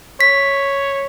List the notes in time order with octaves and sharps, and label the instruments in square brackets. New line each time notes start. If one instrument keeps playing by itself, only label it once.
[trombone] C#5 [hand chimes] B6